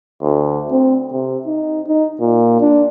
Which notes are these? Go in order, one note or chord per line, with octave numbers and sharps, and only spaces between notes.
D2
C4
C3
D#4
D#4
A#2
D4